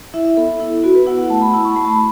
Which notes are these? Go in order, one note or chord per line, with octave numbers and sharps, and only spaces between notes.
E4 E5
E5
B3 A4
E4
B3 F#4
B4
E4 F#5
F#5
A3 A5
B5
E4 A5
C#6
A3 B5
A5
B5